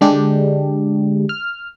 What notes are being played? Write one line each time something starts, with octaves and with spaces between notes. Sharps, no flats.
D3 G#3 D4 G4
F6